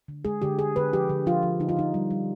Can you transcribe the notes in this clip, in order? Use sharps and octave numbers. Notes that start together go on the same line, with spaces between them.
D3
G#3 G#4
D3 G4
D3 G#4
D3 B4
F3 G4
D3
F3 F4
F3
D3 D#4
F4
D3 D#4
G3
G3